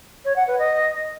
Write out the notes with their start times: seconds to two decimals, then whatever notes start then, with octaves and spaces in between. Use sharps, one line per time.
0.24 C#5
0.36 F#5
0.47 B4
0.58 D#5